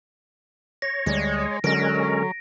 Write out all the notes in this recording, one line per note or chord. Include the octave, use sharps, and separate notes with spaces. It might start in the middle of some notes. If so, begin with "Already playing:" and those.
C#5 A#6
D2 G3 G#3
D3 F#3 G#3 C#4 A#4 A#6 D7